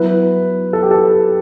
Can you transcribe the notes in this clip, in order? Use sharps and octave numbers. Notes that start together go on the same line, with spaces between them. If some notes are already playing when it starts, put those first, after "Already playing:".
Already playing: F#3 B3 E4 B4
A4
G4
A4